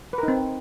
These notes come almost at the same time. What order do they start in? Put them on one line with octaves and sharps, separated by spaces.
B4 A#4 D#4 C4